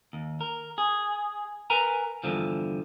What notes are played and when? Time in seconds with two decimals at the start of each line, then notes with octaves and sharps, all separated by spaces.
0.13 D#2
0.41 A#4
0.78 G#4
1.70 A#4 B4 G#5 A#5
2.24 E2 G2 D3 F3